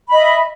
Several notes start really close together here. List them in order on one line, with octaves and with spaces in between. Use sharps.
B5 D#5 E5